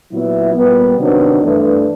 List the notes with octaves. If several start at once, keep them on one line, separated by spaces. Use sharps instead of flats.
A#2 F#3 B3 E4
A#2 G3 B3
C3 D#3 F#3 B3 D4
G2 E3 A3 D4